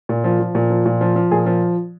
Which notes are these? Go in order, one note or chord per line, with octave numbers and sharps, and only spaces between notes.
A#2
F3
F3
A#2
F3
A#2
F3
F3
A#2 G#4
F3